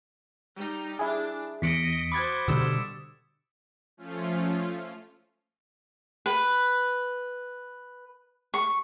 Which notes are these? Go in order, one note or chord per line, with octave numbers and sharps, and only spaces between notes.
G3 D#4
D4 E4 G#4
E2 D#5 B6 C#7 D7
F#4 C5 B5 D6 D#6 G#6 A6
B2 D3 G3 D#6 E6 E7
F3 A3 C#4 F4
B4
C#6